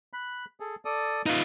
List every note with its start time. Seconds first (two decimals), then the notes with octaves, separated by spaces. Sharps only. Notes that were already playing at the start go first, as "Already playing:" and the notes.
0.13 B5 F#6
0.60 G#4 A4
0.85 A4 D5 D#6
1.26 D#4 F4 B4 F5